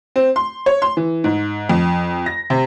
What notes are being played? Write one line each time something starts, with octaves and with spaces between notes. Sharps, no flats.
C4
C6
C#5
C6
E3
G#2
F2
A#6
C3